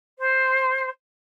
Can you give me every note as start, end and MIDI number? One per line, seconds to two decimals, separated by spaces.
0.17 0.88 72